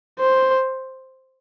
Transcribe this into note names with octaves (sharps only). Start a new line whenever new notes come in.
C5